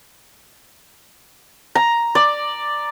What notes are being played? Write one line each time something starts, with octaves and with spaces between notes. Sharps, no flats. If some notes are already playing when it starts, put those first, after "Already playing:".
A#5
D5